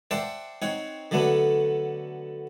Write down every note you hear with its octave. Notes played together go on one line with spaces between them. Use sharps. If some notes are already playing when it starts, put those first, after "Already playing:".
C5 D5 E5 F#5 G5 A5
C4 D#4 C#5 F#5
D3 F#3 A3 B3 D4